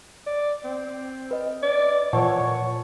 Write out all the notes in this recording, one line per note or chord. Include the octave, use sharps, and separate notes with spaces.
D5
C4
B4 D#5
D5
A#2 E3 F3 C#5 F#5 A5 C#6